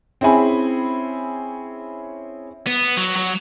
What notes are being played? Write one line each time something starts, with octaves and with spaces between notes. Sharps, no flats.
C4 C#4 E4 G#4 G#5 B5
B3
F#3
F#3